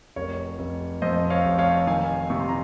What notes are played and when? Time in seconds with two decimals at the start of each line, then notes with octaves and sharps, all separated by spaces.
0.16 F1 A#4 C#5
0.59 F1
1.02 F2 C5 D#5
1.30 C#5 F5
1.44 F1
1.58 C#5 F5
1.87 D#3 F5 G#5
2.30 C3 C#6
2.39 C6
2.49 A#5